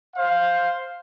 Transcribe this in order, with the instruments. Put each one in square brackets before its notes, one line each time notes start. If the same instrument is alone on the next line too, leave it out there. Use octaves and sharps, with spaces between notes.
[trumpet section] C5 F5